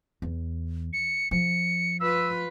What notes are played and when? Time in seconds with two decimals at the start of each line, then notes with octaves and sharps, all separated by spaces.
0.22 E2
0.93 C#7
1.31 F3 C#7
2.00 F4 B4 E6